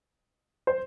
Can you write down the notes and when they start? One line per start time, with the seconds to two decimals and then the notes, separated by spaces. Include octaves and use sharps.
0.67 C5